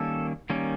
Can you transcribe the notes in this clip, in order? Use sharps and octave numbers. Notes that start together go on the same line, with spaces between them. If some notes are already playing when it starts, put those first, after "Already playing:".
Already playing: D#3 G3 A#3 C#4 A4
D#3 G3 A#3 C#4